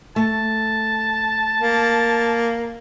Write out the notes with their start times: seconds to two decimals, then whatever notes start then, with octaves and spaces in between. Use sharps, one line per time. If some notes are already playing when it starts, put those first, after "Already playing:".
0.16 A3 A5
1.61 A#3